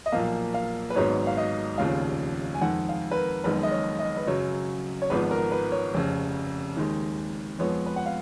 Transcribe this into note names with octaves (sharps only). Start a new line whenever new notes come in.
D#5
B1 A#2 F3 A#3 F5
F5
B4
G#1 G#2 F#3 B3 C#5
F5
D#5
F1 D#2 C#3 F3 F5
G#5
F2 D#3 G#3 F#5
F5
B4
A#4
F#1 F2 D#3 G#3 B3 B4
D#5
C#5
D#5
B4
F#2 C#3 F#3 C#5
C#5
G#1 G#2 F3 B3 B4
A#4
B4
C#5
F1 F2 C#3
D#2 D#3 G#3
F2 F3 G#3 B3 C#5
B4
F#5
F5